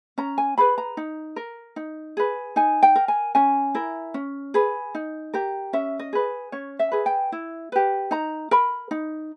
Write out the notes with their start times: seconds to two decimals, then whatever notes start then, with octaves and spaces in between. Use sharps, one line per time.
0.18 C#4 A#5
0.38 G#5
0.58 G#4 B4 B5
0.78 A#5
0.97 D#4
1.36 A#4
1.76 D#4
2.17 G#4 B4
2.56 D#4 G#5
2.83 G5
2.95 A#4
3.08 G#5
3.35 C#4 G#5
3.74 E4 A#4
4.14 C#4
4.54 G#4 B4
4.95 D#4
5.34 G4 A#4
5.73 C#4 E5
5.99 D#5
6.13 G#4 B4
6.52 C#4 C#5
6.79 E5
6.92 G#4 B4
7.06 G5
7.32 E4
7.72 G4 B4
8.11 D#4 A#5
8.51 A#4 B5
8.91 D#4